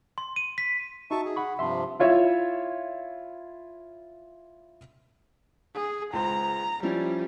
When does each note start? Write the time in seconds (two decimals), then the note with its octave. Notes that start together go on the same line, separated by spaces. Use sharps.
0.18 C6
0.36 D#7
0.58 B6
1.11 D#4 F#4 E5 A5 C#6
1.25 G#4
1.36 F#5 B5 C#6
1.59 G2 C3 F3 E5 C6
2.00 E4 F4 C#5 E5
5.74 G#4
6.13 C#2 C5 A#5
6.83 F3 G3 C#4 E4